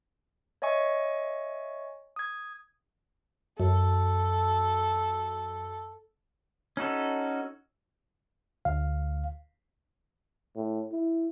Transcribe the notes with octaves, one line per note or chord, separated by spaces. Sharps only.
C#5 D#5 E5 G#5 C#6
D#6 G#6
F#2 A4
C#4 D#4 F#4 A4
D2 F5
A2
E4